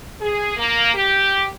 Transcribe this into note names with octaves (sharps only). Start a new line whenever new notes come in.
G#4
A#3
G4